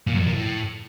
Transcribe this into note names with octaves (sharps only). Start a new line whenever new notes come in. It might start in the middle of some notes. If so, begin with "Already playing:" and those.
A#2
F#2
F2
A#2
A2